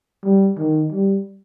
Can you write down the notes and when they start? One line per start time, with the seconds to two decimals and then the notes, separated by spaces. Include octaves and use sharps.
0.24 G3
0.58 D#3
0.92 G3